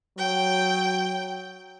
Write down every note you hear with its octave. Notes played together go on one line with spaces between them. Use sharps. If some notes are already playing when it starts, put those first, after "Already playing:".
F#3 G5